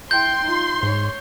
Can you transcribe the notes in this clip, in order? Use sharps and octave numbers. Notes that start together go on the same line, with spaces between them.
E4 G5 C6 G6
D#4 F4
G#2 C#5